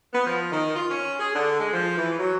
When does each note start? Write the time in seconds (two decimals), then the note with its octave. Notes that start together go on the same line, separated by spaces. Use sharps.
0.13 B3
0.27 F3
0.52 D#3
0.76 F4
0.91 C#4
1.19 G#4
1.35 D3
1.59 G#3
1.73 F3
1.97 E3
2.19 F#3